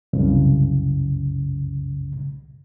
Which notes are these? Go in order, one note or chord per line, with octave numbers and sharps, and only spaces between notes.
C2 F#2 C#3